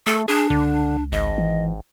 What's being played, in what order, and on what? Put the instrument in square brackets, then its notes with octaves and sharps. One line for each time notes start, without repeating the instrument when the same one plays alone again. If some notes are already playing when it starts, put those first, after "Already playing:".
[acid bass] A3 [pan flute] A4
[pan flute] D4 [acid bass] G#4
[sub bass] C#2 [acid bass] D3
[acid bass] G#1 [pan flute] D#5
[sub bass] E3